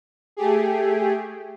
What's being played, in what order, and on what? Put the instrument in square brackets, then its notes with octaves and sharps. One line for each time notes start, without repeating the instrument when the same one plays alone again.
[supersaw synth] A3 G4 G#4